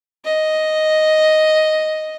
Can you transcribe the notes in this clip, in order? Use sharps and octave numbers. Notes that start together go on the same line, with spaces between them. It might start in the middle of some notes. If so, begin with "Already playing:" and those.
D#5